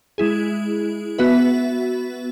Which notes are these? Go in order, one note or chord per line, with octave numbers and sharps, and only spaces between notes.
G#3 E4 G#4
B3 F#4 B4 E5